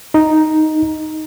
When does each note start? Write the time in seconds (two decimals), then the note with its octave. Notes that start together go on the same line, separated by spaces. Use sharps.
0.14 D#4